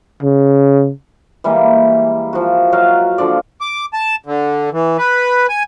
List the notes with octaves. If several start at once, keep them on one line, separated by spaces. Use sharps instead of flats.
C#3
E3 G3 G#3 A#3
F3 F#4
F#3 F#4 D#5 F5
D3 F3 D5
D6
A5
D3
E3
B4
G#5